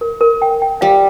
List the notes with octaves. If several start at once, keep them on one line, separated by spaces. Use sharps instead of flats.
A#4
A#4
G5
G5
G3 F5